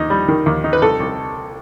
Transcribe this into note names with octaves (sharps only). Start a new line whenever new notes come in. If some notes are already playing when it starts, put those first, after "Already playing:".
Already playing: D#2 D#4
G3
D#3
D#2
D#4
B4
C2 A4
C2